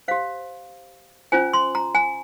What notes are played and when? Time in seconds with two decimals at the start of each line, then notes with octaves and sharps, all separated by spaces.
0.08 G4 C5 F5
1.32 C#4 F4 C5 G#5
1.53 C6
1.75 A#5
1.95 G#5